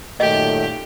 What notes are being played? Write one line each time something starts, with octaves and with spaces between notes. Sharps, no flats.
F#2 A#2 D#3 A3 G4 D#5